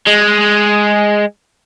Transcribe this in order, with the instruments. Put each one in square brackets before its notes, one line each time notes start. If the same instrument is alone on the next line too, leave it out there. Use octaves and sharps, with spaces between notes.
[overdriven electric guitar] G#3